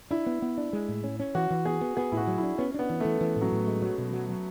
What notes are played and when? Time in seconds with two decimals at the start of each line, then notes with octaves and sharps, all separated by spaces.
0.11 D4 E4
0.26 B3
0.42 B3
0.58 D4
0.73 G#3
0.88 A2
1.04 C#4
1.19 C#4
1.35 E3 F#4
1.50 E3
1.65 B3 G#4
1.81 B3
1.97 B3 G#4
2.12 A2 E4
2.17 F#4
2.27 F#3
2.38 E4
2.43 D4
2.58 B3 C#4
2.74 B3 D4
2.89 E3
3.00 A3
3.05 E3
3.21 E3
3.36 A2
3.41 F#3
3.52 A2
3.67 G#3
3.82 F#3
3.98 B2
4.13 F#3
4.29 F#3